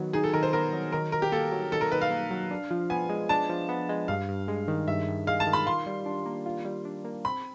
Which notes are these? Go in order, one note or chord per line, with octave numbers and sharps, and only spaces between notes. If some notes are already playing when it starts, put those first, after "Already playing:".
Already playing: D#3 F#3 B3
D#4 G#4
A4
D#3 A#4
C5
B3 A#4
F#3
D#3 A#4
D#3 A#4
G4
A#3 A4
F#3
D#3 A4
A#4
D#3 B4
F5
A#3
F#3
D4
F3
B3 G#5
G#3
D4 A5
F3
B3
G#3
G2 F5
G2
G#3
D#3
G2 E5
G2
G#3 F5
A5
D#3
B5
F4 C6
G3
D4
A#3
F4
G3
D4
A#3
C4 B5